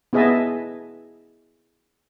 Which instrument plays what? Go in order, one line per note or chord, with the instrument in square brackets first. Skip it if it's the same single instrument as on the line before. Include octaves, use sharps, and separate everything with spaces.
[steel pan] B3 E4 G#4 D#5 E5 A5